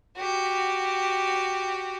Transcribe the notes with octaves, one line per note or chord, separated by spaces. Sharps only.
F#4 G4